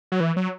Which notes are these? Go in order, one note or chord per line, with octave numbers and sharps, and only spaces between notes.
F#3
E3
F#3